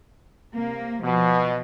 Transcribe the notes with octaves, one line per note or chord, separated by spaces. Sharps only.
C3 A#3
B2 F3